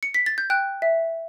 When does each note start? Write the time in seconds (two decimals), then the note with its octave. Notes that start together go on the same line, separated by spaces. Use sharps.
0.03 C#7
0.14 B6
0.26 A6
0.38 G6
0.50 G5 F#6
0.82 E5